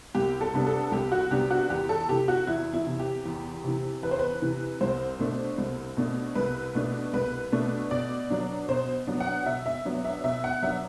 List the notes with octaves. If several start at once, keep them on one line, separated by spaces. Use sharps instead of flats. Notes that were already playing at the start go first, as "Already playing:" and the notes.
C2 G4
A4
C3 G3 B3 D4
A4
C2 G4
F#4
C3 G3 B3 D4 G4
F#4
E2 G4
A4
C3 E3 G4
F#4
E2 E4
E4
C3 E3
G4
E2
C3 E3
E2 B4
C5
B4
C3 E3
C2 C5
B2 A3 D4
C2
B2 A3 D4
C2 B4
B2 A3 D4
C2 B4
B2 A3 D4
B2 D5
F#3 B3 D4
B2 C5
F#3 B3 D4
F#5
B2 E5
E5
F#3 B3 D4
E5
B2 E5
F#5
F#3 B3 D4 E5